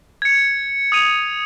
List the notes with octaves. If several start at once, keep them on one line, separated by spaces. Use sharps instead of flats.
G#6 C#7
D#6 G#6 D#7 F7